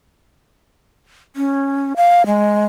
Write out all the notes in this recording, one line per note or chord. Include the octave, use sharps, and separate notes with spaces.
C#4
F5
G#3